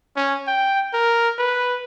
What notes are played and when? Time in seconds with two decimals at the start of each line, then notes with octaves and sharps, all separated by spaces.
0.16 C#4
0.47 G5
0.93 A#4
1.38 B4